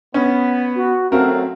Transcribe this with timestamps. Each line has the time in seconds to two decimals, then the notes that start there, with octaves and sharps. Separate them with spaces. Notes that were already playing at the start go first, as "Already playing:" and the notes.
0.14 B3 C#4
0.76 F#4
1.12 F#2 F#3 A3 C4 F#4 A#4 F5